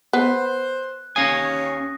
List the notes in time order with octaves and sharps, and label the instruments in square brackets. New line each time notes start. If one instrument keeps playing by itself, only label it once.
[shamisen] B3 [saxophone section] C5 [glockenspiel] F#6
[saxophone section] D#2 C#5 [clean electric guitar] C#4 F5 G#5 [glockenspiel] D#6 A#6